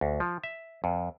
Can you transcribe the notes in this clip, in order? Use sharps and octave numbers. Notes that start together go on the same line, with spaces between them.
D2
F3
E5
F2